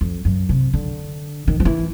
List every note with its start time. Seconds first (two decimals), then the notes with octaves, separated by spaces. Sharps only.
0.01 F2
0.25 F#2
0.49 C3
0.73 D3
1.48 D#3
1.60 F3
1.65 E3